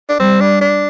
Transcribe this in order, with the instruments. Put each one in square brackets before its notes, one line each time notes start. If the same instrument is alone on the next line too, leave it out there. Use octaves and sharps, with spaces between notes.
[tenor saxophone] D4
[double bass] G3 [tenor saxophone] C4
[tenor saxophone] D4
D4